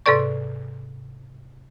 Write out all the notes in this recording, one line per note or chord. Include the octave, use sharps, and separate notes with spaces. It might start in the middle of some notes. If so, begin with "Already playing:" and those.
G#2 C3 A4 B4 D5 C#6